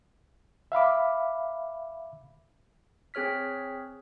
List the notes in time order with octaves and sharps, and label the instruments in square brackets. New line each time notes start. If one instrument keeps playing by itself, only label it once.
[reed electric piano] E5 F5 B5 D6
[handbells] C4 G#4 C#5 F6 B6